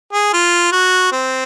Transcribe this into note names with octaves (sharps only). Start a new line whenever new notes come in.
G#4
F4
F#4
C4